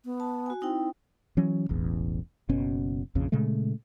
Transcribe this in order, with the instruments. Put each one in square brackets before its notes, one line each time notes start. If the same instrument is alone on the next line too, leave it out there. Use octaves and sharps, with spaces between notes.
[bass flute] B3
[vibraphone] A5
F#4 G#5
[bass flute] C4 [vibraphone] D#4 E4 G5
[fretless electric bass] E3 F#3 C#4
E1 A1 E2
F#1 B2 C#4
A#1 F2 C#3
A#2 C#3 G#3 A3